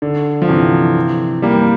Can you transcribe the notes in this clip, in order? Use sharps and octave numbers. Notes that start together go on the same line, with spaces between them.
D3
F3
C3 E3
G3 A#3